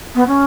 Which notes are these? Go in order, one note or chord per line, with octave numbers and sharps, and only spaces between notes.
B3
C#4